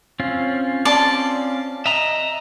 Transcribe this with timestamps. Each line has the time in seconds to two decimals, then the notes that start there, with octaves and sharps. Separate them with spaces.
0.20 C4 C#4 F4
0.85 D5 A5 C6
1.86 D#5 E5 A#5